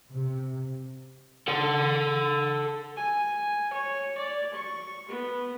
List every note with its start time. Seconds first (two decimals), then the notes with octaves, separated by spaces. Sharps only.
0.11 C3
1.48 A4 F#5
2.97 G#5
3.73 C#5
4.18 D5
4.54 C#6
5.09 B3